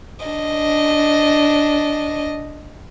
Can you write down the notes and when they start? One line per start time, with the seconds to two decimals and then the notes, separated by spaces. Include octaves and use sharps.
0.25 D4 D#5